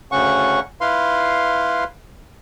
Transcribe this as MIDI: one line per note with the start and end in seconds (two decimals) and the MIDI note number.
0.12 0.60 38
0.12 0.60 49
0.12 0.60 61
0.12 0.60 78
0.12 0.60 85
0.81 1.84 64
0.81 1.84 71
0.81 1.84 77
0.81 1.84 84